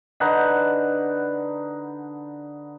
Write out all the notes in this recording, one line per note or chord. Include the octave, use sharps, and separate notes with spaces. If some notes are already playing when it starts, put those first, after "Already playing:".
D3 D#4 B4 F#5